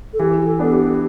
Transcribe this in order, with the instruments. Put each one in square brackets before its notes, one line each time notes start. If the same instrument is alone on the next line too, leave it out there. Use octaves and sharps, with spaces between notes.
[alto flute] A4
[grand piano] E3 [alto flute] G4
[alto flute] G4
A4
[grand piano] B3 D4 [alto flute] A4
[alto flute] G4